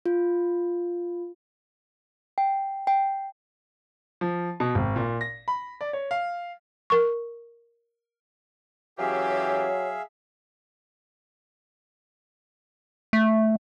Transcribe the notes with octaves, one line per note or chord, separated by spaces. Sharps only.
F4
G5
G5
F3
B2
G#1
A#2
A#6
B5
D5
C#5
F5
A#4 C#6
E3 F#3 C#4 G4 G#4 C#5 E5 F5
A3